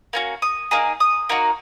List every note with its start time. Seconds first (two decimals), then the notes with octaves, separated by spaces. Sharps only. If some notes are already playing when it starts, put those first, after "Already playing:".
0.13 A#3 C#4 F#4
0.42 D#6
0.71 A#3 D#4 G#4
1.00 D#6
1.29 A#3 D#4 F#4